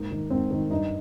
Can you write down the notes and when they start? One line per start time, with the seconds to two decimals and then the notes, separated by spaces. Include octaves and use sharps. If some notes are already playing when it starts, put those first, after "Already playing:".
Already playing: G#2 A#3
0.11 D#3
0.30 G#2 C4
0.51 D#3
0.71 G2 D#4